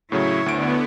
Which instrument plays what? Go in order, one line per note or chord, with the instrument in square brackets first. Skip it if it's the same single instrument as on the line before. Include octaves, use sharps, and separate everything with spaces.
[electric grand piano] A2 C#3 F#3 [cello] E4 C#5
[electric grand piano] D2 D7 [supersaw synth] D3 B3